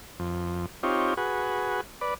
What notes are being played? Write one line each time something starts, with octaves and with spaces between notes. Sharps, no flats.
F2
C4 D#4 F4 G4 C#5
F#4 G#4 B4
B4 D5